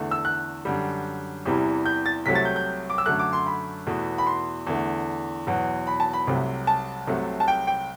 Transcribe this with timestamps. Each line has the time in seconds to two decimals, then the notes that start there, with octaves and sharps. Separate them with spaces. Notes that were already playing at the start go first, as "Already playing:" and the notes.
Already playing: E2 D3 A3
0.11 E6
0.25 F#6
0.65 F#2 D3 G3
1.46 E2 C3 E3 G3
1.86 G6
2.06 A6
2.26 C2 C3 F#3 A3 B6
2.35 A6
2.45 G6
2.56 G6
2.90 D6
2.98 E6
3.06 F#2 D3 F#3 A3 F#6
3.19 D6
3.33 C6
3.46 B5
3.87 E2 B2 A3
4.18 B5
4.27 C6
4.67 E2 D3 A3
5.47 E2 B2 F#3
5.87 B5
6.00 A5
6.13 B5
6.27 C2 C3 F#3 A3
6.67 A5
7.07 C2 C3 F#3 A3
7.40 A5
7.48 G5
7.67 G5